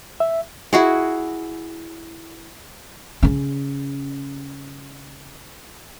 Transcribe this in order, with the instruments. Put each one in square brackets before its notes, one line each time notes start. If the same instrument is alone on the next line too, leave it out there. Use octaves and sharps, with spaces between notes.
[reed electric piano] E5
[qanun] E4 F#4 G#4
[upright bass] C#3 C#4